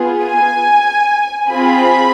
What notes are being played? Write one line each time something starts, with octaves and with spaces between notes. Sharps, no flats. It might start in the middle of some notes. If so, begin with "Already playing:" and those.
Already playing: B3 F4 G#4
G#5
C4 F4 G#4 B5